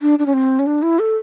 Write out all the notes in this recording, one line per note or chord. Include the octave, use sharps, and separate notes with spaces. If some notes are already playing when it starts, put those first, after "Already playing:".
D4
D4
C#4
C4
C#4
D4
E4
A4